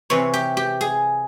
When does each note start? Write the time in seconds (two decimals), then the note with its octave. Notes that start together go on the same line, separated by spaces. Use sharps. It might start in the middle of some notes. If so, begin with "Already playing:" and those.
0.10 C3 E3 C#5
0.34 G4
0.57 G4
0.81 G#4